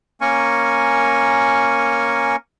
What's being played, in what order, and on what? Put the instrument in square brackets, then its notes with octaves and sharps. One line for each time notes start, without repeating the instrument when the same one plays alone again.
[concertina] A#3 C#4 A#4 G#5 C#6